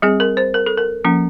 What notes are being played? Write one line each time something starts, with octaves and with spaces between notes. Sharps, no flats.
G3 C4 G#4
A#4
C5
A#4
A4
A#4
F3 A#3 C#4